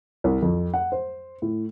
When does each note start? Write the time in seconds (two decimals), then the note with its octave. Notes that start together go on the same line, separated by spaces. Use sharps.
0.24 C2
0.42 F2
0.74 F#5
0.92 C5
1.42 A2